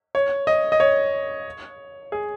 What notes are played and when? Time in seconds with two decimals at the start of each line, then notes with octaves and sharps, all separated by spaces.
0.15 C#5
0.47 D#5
0.72 D#5
0.80 C#5
2.12 G#4